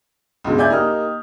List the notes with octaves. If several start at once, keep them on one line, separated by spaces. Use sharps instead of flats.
C#2 G2 B2 G#3
D5 E5 G#5 G6 G#6
A#3 D#4 G4 D#6 F6